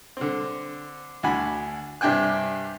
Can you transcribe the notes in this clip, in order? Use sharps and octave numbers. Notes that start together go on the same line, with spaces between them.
D3 C4
D2 D4 F#4 G#5 B5
G2 C3 D4 G5 G#5 F#6